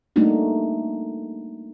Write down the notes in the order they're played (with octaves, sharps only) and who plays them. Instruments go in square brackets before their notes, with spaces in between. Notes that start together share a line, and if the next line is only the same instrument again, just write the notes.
[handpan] G3 A3 A#3 D4 D#4 F#4